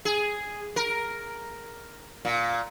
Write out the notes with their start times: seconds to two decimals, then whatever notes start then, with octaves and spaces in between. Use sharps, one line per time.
0.05 G#4
0.76 A#4
2.25 A#2